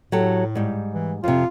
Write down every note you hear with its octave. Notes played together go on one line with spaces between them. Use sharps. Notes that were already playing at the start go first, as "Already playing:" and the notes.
A2 F#3 G4 A4
G#2 G3
E3
F2 C3 F4